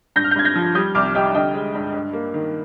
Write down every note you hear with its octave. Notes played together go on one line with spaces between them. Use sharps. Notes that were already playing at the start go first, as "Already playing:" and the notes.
G2 G6 A#6
F6
G6
G2 G#6
G6 A#6
F3
G3 D#6 G6
C2 D6 F6
G3 D#5 G5
D3 D#5 G5
G#3
G2
G2
A#3
D#3